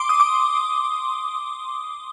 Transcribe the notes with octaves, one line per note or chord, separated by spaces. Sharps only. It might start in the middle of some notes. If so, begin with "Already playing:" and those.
Already playing: C6 D6
D#6
D6